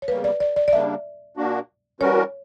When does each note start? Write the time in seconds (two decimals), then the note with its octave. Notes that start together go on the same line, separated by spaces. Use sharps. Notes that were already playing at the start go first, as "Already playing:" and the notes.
0.02 C#5
0.08 E2 C#3 G3 A#3 B4
0.24 D5
0.40 D5
0.56 D5
0.68 D5
0.72 C#3 G3 A#3 D4 E5
1.37 A#2 A#3 D4 F#4
2.00 E3 G3 C#4 F#4 A#4 C#5